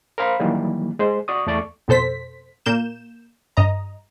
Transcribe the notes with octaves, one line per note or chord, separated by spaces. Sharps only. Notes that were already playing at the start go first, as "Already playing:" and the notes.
A#4 C5 F5 B5
D#3 E3 F#3 G3 A#3
G#3 C5
F#4 D5 C#6 D#6
E2 A3 A4 D5 C#6
F2 B2 A4 C5 B6
A#2 A#3 G6 E7
G2 D#5 A#5